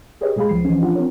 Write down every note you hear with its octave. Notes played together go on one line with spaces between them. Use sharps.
G4 G#4 B4 C#5 D#5
A#2 G#3 G#4 F5 B5
C#2 F3 C7
E3 F3 C#4
F3 D4 F4 F#5
C4 F4 A#4 C#5